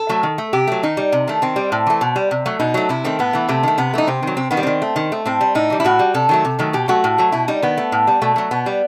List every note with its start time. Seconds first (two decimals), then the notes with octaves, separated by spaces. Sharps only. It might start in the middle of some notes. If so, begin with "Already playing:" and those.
Already playing: A4
0.09 F#3 A3
0.23 D#3
0.38 A3
0.53 C3 G4
0.67 F#3 A3
0.83 D#3 D#4
0.97 G3
1.12 C3
1.27 D#3 A3
1.42 D#3 C4
1.56 G3
1.72 A2
1.87 E3 A3
2.01 B2
2.16 G3
2.31 C3
2.46 F#3 A3
2.59 B2 D#4
2.74 F#3 A3
2.89 C3 E4
3.04 D#3 A3 C4
3.19 A2 B3
3.33 E3 A3
3.49 C3 A3
3.63 D#3 A3
3.78 C3 B3
3.94 E3 A3 D#4
4.07 C3 C4
4.23 D#3 F#3
4.37 C3 C4
4.51 D#3 B3
4.57 G3
4.63 D#3 C4
4.82 A3
4.96 D#3
5.12 A3
5.26 A2 C4
5.41 G3
5.55 A2 D#4
5.70 E3 G3
5.80 E4
5.84 A2 F#4
5.99 G3
6.14 C3 A4
6.29 D#3 F#3 A3
6.45 C3
6.59 D#3 F#3 A3
6.73 B2 G4
6.88 F#3 A3 F#4
7.04 A2
7.18 F#3 A3
7.32 B2 E4
7.48 G3 D#4
7.62 D#3 B3
7.77 A3
7.92 A2
8.07 G3
8.22 B2 A3
8.36 F#3 A3
8.51 B2 B3
8.66 G3